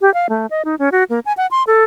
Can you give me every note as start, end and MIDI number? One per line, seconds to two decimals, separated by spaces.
0.01 0.13 67
0.14 0.27 77
0.29 0.46 57
0.51 0.62 75
0.65 0.75 63
0.79 0.89 61
0.92 1.04 66
1.10 1.20 58
1.25 1.33 80
1.37 1.47 78
1.51 1.63 84
1.67 1.84 69